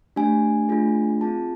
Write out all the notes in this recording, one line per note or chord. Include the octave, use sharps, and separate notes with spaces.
A3 D4 G4 G#5
A3 D4 F4 G#4
C4 F4 G#4 A5